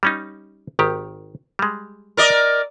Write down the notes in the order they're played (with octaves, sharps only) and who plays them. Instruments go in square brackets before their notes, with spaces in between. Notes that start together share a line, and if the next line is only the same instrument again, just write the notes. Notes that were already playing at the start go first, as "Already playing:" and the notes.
[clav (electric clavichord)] G3 C#4 D#4
G#1 D#3 G4
G3 G#3
[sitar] A#4 D5 D#5